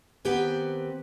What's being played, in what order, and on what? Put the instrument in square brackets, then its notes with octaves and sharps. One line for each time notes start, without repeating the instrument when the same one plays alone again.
[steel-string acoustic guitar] D#3 B3 C4 G4 B4 G#5